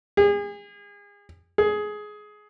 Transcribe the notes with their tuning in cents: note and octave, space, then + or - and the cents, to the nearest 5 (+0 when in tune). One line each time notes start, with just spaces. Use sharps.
G#4 -35
G#4 +15